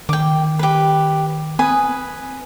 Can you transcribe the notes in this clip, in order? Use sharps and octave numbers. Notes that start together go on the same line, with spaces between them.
D#3 G5 D6
G4 B4
C4 B4 G#5 D#6